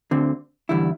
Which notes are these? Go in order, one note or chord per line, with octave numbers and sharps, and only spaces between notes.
D2 D3 C4
E2 D3 G3 E4